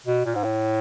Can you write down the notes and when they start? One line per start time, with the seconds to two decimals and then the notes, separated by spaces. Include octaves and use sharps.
0.07 B2
0.25 A#2
0.35 G#2
0.44 A2